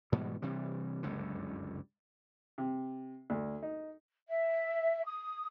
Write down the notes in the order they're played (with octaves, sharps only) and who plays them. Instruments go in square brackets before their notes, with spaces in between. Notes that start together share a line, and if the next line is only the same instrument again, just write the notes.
[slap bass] G#2 B2 E3 G3
C3 E3 G3
F#1 C#2 G2 D3
[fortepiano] C3
D2
D#4
[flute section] E5
D#6